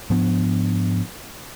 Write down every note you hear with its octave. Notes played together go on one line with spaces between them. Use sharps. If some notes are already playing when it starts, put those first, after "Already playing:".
G#2 F3 B3 D4